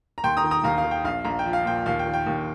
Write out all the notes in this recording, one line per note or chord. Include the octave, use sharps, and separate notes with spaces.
A#5
D#2 G5 C6
A#5 D#6
D#3
A#5 D#6
D#2 F5 A#5
F5
D#3
G5
A#1 F5
A#1 A#5
G5
F3
F5
A#2 G5
D#2 F5
G5
D#3
G5
D#2